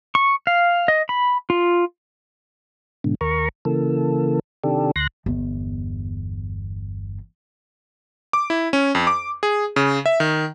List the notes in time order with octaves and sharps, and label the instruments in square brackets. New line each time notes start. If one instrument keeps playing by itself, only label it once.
[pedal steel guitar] C#6
F5
D#5
B5
F4
[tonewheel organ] G#2 B2 D3
D#2 A#4 A#5 C#6
C#3 E3 A#3 A4
C3 D#3 D4 G4 A4
D2 C6 F#6 A#6
[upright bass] G1 E2
[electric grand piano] D6
E4
C#4
F2
D6
G#4
C#3
E5
D#3